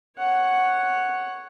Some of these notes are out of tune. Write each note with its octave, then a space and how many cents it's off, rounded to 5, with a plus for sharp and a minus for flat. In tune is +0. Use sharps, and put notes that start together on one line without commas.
C#5 -5 F#5 +0